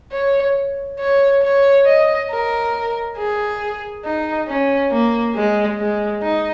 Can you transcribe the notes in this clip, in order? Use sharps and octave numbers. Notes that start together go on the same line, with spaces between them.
C#5
C#5
C#5
D#5
A#4
G#4
D#4
C#4
A#3
G#3
G#3
D#4